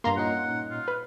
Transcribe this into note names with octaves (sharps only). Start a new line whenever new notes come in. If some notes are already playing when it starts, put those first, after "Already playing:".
G2 A#3 F4 A#5 C6
A#2 C#4 D#4 F#5
F4
B4